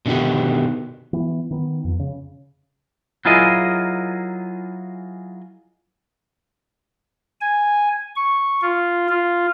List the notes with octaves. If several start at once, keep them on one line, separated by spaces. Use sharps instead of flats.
B2 D3 D#3 F#4 G4
E3 B3
D#3 B3
F2
C#3
F#3 E4 F4 G#4 A#4 D#5
G#5
C#6
F4
F4